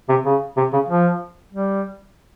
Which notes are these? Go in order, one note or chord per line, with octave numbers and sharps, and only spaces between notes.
C3
C#3
C3
C#3
F3
G3